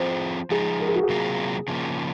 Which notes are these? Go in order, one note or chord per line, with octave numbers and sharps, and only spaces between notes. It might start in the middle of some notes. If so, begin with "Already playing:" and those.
Already playing: F3 C4 F4 G#4 C5
F3 G#3 D#4 G#4
A#4
G#4
F#4
G#4
C3 F#3 A#3 F4
C#3 F3 A#3